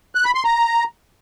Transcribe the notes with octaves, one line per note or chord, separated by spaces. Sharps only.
F#6
B5
C6
A#5